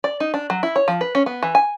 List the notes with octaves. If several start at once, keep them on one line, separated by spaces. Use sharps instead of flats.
D5
D#4
D4
F#3
E4
C#5
F3
B4
C#4
B3
E3
G#5